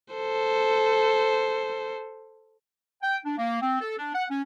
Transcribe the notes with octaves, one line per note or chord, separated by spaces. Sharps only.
A4 C5
G5
D4
A#3
C4
A4
D4
F#5
C#4